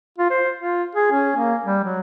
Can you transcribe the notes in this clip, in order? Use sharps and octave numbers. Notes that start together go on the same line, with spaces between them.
F4
C5
F4
G#4
C#4
A#3
G3
F#3